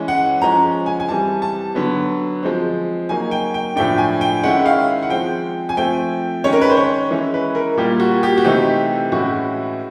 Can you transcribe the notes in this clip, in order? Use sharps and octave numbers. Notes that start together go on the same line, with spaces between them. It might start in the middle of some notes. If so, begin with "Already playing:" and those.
Already playing: E3 G#3 C#4
F#5
F3 G#3 C#4 A#5
G#5
G#5
E3 G3 C4 A5
A5
D3 F#3 B3
F3 G#3 C4
F#3 A#3 D#4 G#5
G5
G5
A2 F3 A3 D4 G5
G#5
G5
D#3 G#3 C#4 E4 F#5
F5
F#5
F3 G#3 C4 G5
G#5
F3 A3 C4 G5
D#3 G#3 C#4 C#5
A#4
B4
C5
C#5
E3 G#3 C#4 E4
B4
A#4
A#2 G3 A#3 G4
F#4
G4
F#4
C3 E3 A3 C4 D#4 G4
A2 E3 G#3 C#4 E4 F#4